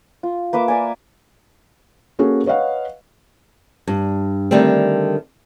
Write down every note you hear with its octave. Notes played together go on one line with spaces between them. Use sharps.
F4
A#3 B4 E5 D6
A#4 D5 G#5
A#3 C#4 F#4 G#4 A4
B4 C#5 D#5 F5 F#5
G2
D3 D#3 G3 A3 C4